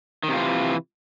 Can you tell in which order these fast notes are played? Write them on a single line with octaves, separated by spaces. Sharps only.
D#3 C3 F4 E3